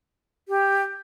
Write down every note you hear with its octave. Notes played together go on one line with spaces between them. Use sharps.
G4